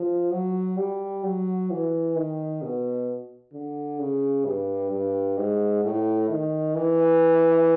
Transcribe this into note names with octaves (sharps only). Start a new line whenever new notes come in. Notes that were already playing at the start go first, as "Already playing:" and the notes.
Already playing: F3
F#3
G3
F#3
E3
D#3
B2
D3
C#3
G2
G2
G#2
A2
D#3
E3